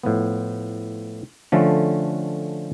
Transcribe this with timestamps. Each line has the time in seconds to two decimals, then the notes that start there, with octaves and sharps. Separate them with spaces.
0.03 A2 F3 B3
1.52 D3 F3 A3 C#4